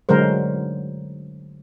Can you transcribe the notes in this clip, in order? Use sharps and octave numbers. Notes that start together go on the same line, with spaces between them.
D3 F#3 G#3 A#4 C5